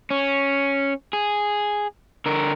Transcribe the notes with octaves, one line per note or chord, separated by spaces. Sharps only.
C#4
G#4
D3 A#4